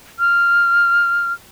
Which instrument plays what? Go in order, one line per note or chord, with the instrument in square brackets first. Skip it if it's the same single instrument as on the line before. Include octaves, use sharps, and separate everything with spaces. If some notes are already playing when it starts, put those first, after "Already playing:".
[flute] F6